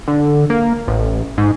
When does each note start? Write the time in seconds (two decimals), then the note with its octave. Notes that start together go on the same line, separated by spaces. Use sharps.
0.08 D3
0.50 A#3
0.88 A1
1.38 G#2